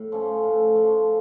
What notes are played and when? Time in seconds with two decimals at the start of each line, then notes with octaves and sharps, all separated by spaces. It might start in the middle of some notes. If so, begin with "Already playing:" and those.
Already playing: A2
0.12 F3 A3 C#4
0.44 A2
0.75 F3 A3 C#4